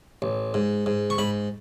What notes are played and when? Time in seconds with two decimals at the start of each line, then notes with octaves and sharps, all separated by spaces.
0.22 A1
0.54 G#2
0.86 G#2
1.10 C#6
1.18 G#2 B5